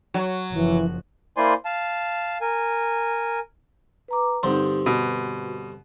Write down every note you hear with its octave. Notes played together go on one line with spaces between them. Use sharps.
F#3
F#1 E3 F3
A#3 E4 C5 D5 G#5 C6
F5 A5
A#4 G#5
B4 A#5 D6
G2 D3 C4 D#4 G4
B2 F#4